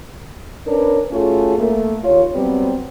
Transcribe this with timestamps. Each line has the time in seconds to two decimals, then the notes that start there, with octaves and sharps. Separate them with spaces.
0.67 C#4 D4 A#4 B4
1.12 A3 C#4 F4 F#4 G#4
1.58 A3 A#3
2.04 D#2 F4 C#5
2.34 F#3 G3 B3 C4